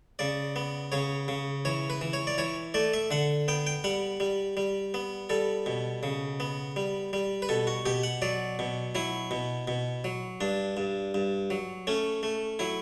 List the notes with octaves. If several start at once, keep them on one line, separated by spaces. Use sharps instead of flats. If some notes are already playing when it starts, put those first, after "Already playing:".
C#3 D5
B3
C#3 C#5
C#3
E3 C#5
B4
E3
C#5
D5
E3 C#5
A3 D5
E5
D3 F#5
B3 G5
G5
G3 F#5
G3
G3
B3
G3 A4
B2
C#3
B3
G3
G3
B4
B2 A4
F#4
B2 G4
F#5
F#3 D5
B2
F#3 E4
B2
B2
F#3
G2 D4
G2
G2
F#3
A3 C#4
A3
F#3 E4